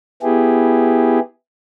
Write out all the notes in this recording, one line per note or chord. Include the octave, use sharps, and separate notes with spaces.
B3 E4 G4 G#4